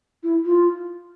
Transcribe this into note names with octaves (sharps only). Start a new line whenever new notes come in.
E4
F4